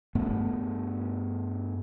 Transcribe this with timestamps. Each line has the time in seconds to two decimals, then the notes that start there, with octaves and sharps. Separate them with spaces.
0.15 G2 A3 B3